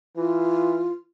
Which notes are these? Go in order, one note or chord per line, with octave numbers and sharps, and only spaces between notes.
E3 F4